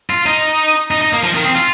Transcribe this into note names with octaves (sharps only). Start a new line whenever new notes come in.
F4
D#4
D#4
D#4
A#3
F3
D#3
C4
F4